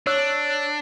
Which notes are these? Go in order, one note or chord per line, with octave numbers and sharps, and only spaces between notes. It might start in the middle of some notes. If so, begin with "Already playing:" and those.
D4 C#5 E6 F#6